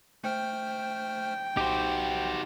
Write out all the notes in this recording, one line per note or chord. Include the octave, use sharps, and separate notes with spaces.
A3 C5 G5 F6
B1 D#4 F#4 G4 C5